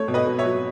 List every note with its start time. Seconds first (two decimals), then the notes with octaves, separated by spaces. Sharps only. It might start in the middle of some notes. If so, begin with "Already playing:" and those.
Already playing: A3 C#5
0.08 B2
0.14 B4 D#5
0.27 B2
0.38 C#5 E5
0.45 F#3